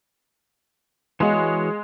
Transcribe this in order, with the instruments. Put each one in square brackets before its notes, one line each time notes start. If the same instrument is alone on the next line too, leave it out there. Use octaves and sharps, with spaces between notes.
[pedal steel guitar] E3 F#4 C#5 [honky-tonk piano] G#3 [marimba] D#5 F5 G#5